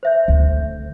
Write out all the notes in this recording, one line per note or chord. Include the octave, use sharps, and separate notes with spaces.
C5 E5 G6
D2